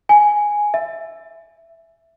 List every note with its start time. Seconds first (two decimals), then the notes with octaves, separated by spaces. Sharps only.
0.09 G#5
0.74 E5